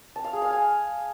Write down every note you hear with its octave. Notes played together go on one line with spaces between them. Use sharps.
A5
F5
G#4
F5
G#5